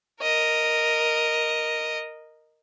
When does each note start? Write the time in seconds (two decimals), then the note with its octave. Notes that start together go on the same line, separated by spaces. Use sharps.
0.21 A#4 D#5